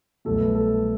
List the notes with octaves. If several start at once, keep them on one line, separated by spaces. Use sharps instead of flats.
C2 B2 F#3 A3 A4
B4
A4